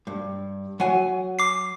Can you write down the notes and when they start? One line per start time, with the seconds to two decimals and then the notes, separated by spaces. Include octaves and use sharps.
0.07 G2
0.80 F#3 F#5 G#5
1.39 D6 C7